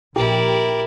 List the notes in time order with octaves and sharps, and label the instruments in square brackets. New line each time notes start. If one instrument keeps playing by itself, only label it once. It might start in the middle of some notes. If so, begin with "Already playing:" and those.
[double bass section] A#1 [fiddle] E4 D5 [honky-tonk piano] G4 [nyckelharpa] A#4